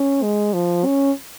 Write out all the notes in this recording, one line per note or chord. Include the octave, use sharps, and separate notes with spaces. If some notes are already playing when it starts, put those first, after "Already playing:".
Already playing: C#4
G#3
F3
C#4